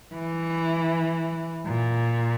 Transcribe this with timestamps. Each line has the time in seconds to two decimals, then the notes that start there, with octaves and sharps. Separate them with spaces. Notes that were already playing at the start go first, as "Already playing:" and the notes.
0.14 E3
1.67 A#2